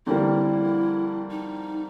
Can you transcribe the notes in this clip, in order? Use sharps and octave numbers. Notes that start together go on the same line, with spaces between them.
F2 D3 G3 A#3 E4
D#4